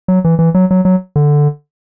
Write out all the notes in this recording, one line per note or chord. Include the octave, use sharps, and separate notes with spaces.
F#3
E3
E3
F#3
F#3
F#3
D3